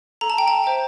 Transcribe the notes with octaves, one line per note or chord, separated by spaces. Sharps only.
A4 A#5
A5
G5
A5
C5 E5 G5